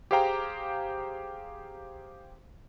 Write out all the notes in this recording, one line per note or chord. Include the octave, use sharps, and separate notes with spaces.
G4 G#4 C5 F5 G5 A#5